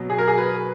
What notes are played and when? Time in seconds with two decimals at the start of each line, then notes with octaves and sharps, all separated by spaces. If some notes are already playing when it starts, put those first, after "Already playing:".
Already playing: B2 F#3
0.10 G#4
0.19 A#4
0.28 G#4
0.38 B4